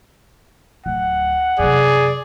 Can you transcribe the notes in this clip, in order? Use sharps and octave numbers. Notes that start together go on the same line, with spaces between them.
D1 F#5
F#2 C3 G#4 D5